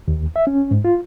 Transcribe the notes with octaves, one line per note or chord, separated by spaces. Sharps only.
D#2
E5
C#4
G#2
F4